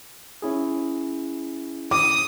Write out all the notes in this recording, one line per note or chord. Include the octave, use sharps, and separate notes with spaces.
C#4 E4 G#4
D6 D#6